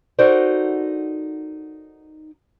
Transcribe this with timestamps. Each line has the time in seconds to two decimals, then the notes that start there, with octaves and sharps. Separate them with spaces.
0.19 D#4 F#4 A4 A#4 C5 D5